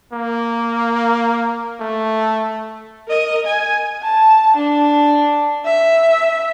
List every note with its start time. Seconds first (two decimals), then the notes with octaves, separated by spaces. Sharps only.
0.13 A#3
1.80 A3
3.08 A#4 D#5
3.47 G#5
4.04 A5
4.56 D4
5.66 E5